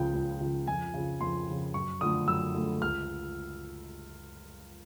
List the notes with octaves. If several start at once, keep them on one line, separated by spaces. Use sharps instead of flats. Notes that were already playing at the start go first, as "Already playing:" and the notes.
Already playing: C#2 C#3 F3 G5
C#2
C#3 F3
F2 G#5
C#3 F3
F2 C6
C#3 F3
F#2 C#6
D3 F3 A3 D#6
F#2 E6
D3 F3 A3
C#2 F6